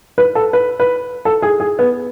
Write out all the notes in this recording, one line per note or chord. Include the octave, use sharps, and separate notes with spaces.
B4
A4
B4
B4
A4
G#4
G#4
B3